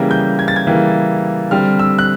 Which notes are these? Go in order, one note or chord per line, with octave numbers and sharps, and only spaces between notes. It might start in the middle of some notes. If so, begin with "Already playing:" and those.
Already playing: C#3 E3 G3 A#3
G6
G#6
A6
G#6
C#3 E3 G3 A#3
D3 G3 C4 F6
E6
F#6